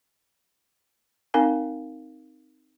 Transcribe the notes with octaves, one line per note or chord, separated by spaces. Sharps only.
C4 D#4 A#4 F5 G#5